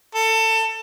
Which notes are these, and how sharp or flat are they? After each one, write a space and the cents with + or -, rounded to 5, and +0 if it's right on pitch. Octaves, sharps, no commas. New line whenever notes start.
A4 +25